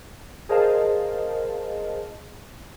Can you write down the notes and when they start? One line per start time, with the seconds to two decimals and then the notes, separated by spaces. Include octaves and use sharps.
0.49 G#4 A#4 C5 D#5 F5 A5